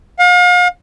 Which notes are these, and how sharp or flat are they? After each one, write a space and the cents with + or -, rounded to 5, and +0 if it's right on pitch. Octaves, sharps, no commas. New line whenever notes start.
F5 +40